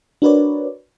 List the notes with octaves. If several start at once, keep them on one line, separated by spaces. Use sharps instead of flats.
D4 F#4 A#4 B4 C#5 D5